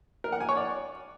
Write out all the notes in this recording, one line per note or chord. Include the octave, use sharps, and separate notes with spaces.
A#4
F#5
G#5
C#5
D5